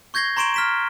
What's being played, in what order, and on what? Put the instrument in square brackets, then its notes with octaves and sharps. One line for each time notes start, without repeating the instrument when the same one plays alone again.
[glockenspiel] C#6 G6 G#6 A#6 C7 G7
A#5 C6 C#6 D7 E7 G7
F6 B6 E7